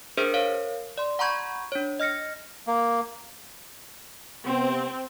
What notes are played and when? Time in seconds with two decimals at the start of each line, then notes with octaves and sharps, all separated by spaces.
0.17 D4 G#4 A#4 C5 E5 F6
0.34 A#4 C#5 F5
0.98 D5 C6
1.19 F#5 A#5 B5 C#6 G6 G#6
1.72 D4 C#5
2.00 D#5 F6 A#6 C#7
2.67 A#3
4.46 C3 B3 C4